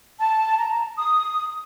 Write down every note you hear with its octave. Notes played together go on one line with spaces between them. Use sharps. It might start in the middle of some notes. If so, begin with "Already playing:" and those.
A5
A#5
D#6